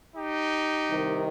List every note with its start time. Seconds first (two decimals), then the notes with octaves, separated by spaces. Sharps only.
0.16 D#4 G4
0.89 C2 C3 D#3